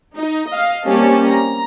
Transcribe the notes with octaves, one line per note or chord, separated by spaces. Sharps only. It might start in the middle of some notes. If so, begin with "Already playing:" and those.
D#4
D#5 F5
G3 A#3 C4 C#4 G4 A5
A#5